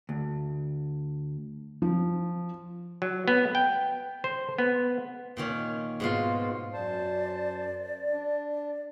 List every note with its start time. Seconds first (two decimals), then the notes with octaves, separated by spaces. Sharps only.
0.09 D2
1.82 F3
3.02 F#3
3.28 B3
3.55 G5
4.24 C5
4.58 B3
5.37 A#2 D#3 C#4
6.00 G#2 B2 F4
6.73 F#2 C5 D5 A5
8.11 D4